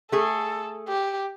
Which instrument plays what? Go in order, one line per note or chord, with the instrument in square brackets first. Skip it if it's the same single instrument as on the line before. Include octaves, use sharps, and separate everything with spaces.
[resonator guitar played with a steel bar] A3 G#4 [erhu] A4
[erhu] G4